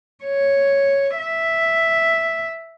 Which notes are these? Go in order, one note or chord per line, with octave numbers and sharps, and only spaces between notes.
C#5
E5